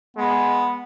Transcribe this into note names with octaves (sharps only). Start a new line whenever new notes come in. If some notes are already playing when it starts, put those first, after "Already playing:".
G#3 B3